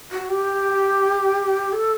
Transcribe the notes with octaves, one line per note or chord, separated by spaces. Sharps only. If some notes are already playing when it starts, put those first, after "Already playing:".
F#4
G4
A4